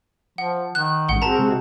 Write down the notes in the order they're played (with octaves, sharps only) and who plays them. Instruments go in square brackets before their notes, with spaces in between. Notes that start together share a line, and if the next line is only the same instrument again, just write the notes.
[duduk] F3 [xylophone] F#5
[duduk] D#3 [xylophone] F#6
[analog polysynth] A1 G#2 [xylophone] F#5 G7
[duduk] C4 [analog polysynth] F#4 G#4 A#4 [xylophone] A5 A#5
[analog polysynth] C3 G#3 F#4